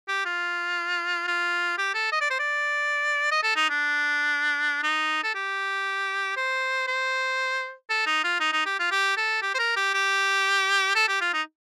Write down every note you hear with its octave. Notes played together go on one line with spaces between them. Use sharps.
G4
F4
F4
G4
A4
D#5
D5
C5
D5
D#5
A4
D#4
D4
D#4
A4
G4
C5
C5
A4
D#4
F4
D#4
D#4
G4
F4
G4
A4
G4
C5
A#4
G4
G4
A4
G4
F4
D#4